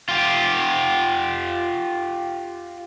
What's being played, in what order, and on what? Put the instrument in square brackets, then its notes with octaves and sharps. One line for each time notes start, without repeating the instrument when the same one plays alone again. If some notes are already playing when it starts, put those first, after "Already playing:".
[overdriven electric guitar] F4 G4